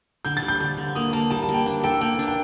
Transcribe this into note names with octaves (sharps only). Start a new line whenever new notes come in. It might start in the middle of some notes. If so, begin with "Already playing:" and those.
D3 G6
A6
G3
G6
D3 G6
D3
A#3 D#6
A#3 A5
G3 A5
A5
A#3
G5
D4 G5
A4 G5
A#3 G5
D4
G5